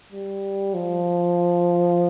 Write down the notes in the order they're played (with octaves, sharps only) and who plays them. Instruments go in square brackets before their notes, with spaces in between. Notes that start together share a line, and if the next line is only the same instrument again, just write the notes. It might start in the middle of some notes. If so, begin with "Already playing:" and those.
[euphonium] G3
F3